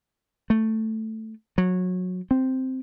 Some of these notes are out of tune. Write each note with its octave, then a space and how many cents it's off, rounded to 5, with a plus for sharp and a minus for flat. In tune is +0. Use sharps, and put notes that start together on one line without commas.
A3 +5
F#3 -20
C4 -5